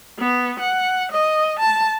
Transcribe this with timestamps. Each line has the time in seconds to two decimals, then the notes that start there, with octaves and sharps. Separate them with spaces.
0.19 B3
0.60 F#5
1.12 D#5
1.60 A5